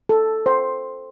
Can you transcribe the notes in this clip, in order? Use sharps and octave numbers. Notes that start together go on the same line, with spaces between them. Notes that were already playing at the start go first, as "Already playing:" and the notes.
A4
C5